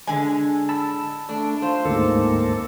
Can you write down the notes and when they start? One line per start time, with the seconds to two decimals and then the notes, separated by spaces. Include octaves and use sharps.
0.07 D3 G#3 G#5
0.69 A5 B5 E6
1.29 A3 D4
1.62 F4 C5
1.85 D2 G#2 A#3 C4 A4